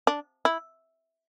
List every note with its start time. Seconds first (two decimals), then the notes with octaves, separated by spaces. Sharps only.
0.07 D4
0.45 E4